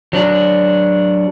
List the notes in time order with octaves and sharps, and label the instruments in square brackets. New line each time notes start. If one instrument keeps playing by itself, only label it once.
[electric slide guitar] F#3 D4